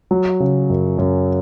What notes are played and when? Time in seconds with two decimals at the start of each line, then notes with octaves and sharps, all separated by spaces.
0.11 F#3
0.40 C#3
0.70 F#2
0.98 F#2